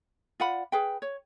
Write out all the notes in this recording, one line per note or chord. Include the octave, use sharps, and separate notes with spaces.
F4 D5 F#5 B5
G#4 B4 G5
C#5